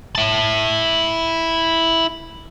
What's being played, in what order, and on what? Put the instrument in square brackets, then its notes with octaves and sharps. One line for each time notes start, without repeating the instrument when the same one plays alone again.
[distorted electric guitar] E4 A5